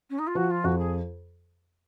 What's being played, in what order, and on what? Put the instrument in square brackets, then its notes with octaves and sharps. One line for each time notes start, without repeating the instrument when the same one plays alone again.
[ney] C#4
D#4
F4
[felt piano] F3 [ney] F#4
[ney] F4
[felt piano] F2 [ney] F#4
[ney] G#4